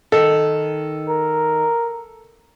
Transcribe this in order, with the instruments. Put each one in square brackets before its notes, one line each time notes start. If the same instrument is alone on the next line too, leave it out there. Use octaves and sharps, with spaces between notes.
[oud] D#3 [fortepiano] A4
[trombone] A#4